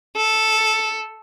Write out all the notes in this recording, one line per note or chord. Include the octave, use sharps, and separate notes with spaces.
A4